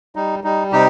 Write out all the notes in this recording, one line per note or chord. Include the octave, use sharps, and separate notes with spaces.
G3 D#4
G3 D#4
C3 D#4 G4